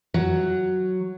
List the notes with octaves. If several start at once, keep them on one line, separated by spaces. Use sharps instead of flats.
F#3